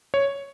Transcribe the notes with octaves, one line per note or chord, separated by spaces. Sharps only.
C#5